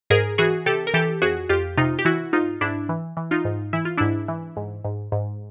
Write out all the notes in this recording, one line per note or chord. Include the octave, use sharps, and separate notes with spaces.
G#2 G#4 A#4
E3 F#4 G#4
C3 G4 A4
A#4
E3 G4 A4
F2 F#4 G#4
F2 F4 G4
C3 D#4 F4
G4
E3 E4 F#4
G#2 D#4 F4
G#2 D4 E4
E3
E3
D#4 F4
G#2
E3 E4
F4
G#2 D4 E4
E3
G#2
G#2
G#2